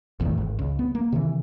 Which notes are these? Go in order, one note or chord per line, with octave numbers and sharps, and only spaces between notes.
F#1 E2 A2 D#3
G#1
C#2
B3
A#3
C3 D#3 E3